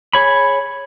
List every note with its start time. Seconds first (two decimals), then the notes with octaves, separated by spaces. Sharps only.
0.13 G#4 C#5 B5